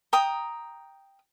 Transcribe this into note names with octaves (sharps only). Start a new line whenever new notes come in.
G5 A#5 D#6